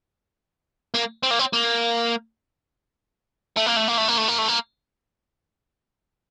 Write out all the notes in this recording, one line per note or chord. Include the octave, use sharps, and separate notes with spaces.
A#3
C4
A#3
C4
A#3
A3
A#3
A3
A#3
A3
A#3
A3
A#3
A3
A#3